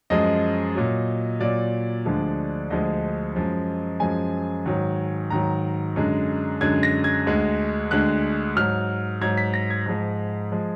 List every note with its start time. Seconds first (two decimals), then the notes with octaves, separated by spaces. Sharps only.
0.10 F#2 F3 G#3 D#5
0.75 A#2 F#3
1.40 A#2 F#3 D5
2.05 D2 D3 F3 G#3
2.70 D2 D3 F3 G#3 D#5
3.36 F#2 F3 G#3
4.00 F#2 F3 G#3 G#5
4.66 G#2 D#3 F#3
5.30 G#2 D#3 F#3 A#5
5.96 F#2 D3 G#3
6.61 F#2 D3 G#3 G#6
6.83 A#6
7.04 G#6
7.26 D2 D3 G#3
7.91 D2 D3 G#3 F#6
8.56 G#2 F#3 F6
9.21 G#2 F#3 G#6
9.38 B6
9.54 A#6
9.70 G#6
9.86 G#2 F3 G#3
10.52 F3 G#3